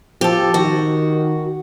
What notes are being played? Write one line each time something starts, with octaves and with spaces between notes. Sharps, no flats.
F3 G4 A4
D#3 F#4